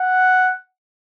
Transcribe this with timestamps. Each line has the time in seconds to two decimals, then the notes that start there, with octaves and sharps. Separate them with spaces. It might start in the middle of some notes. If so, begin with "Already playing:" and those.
Already playing: F#5